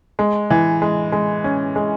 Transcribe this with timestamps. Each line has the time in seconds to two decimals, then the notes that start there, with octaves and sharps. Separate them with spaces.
0.19 G#3
0.50 E3
0.82 G#3
1.12 G#3
1.44 C#4
1.76 G#3